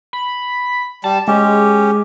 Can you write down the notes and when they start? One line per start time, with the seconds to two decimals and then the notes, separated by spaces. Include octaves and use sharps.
0.13 B5
1.04 G3 A5
1.28 G#3 C#4 G4